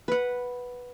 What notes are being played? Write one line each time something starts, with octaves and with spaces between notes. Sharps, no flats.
B4 F#5